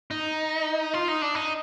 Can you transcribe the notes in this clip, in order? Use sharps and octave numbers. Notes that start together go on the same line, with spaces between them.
D#4
F4
D#4
D4
D#4